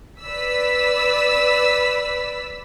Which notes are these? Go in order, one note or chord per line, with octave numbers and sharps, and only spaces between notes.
B4 D5 E6 B6